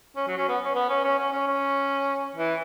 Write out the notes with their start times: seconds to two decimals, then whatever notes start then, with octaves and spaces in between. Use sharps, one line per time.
0.16 C#4
0.27 F#3
0.37 C#4
0.49 B3
0.65 C#4
0.75 B3
0.90 C#4
1.04 C#4
1.18 C#4
1.33 C#4
1.47 C#4
2.35 E3